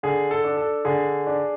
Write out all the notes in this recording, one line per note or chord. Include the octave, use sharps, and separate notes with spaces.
D3 G#4
A4
D4
A4
D3 G#4
D4